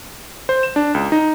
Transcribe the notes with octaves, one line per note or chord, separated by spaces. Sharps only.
C5
E7
D4
C#2
D#4